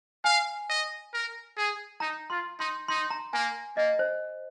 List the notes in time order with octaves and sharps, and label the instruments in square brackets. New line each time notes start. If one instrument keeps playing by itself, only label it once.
[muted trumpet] F5 [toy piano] G#5
[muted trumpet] D#5
A#4
G#4
[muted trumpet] D#4 [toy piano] A#5
[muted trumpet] F4 [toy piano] C6
[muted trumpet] D#4 [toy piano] C6
[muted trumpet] D#4 [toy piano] C6
[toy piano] A#5
[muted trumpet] A#3 [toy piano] G#5
[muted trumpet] A#3 [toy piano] D#5
[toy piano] C5